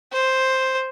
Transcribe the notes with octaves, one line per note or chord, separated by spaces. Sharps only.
C5